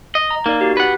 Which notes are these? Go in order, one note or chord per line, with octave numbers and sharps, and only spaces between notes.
D#5
A#5
A#3 D#4 D5
F#4 G4
B4 F#5